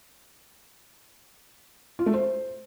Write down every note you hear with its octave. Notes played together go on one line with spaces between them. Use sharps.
F4
A3
C5